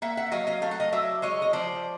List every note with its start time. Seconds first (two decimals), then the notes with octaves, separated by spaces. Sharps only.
0.02 A#3 E5 F#5
0.17 E5 F#5
0.32 F#3 D#5 F5
0.47 D#5 F5
0.62 A3 F5
0.71 F#5
0.80 D#5 F5
0.92 F#3 D5 E5
1.22 G#3 C#5 D#5
1.42 D#5
1.53 F3 C5 D5